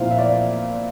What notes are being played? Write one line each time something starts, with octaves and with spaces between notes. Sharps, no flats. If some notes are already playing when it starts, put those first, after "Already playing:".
Already playing: A#2 F3 C4 E4 F5
E5
D5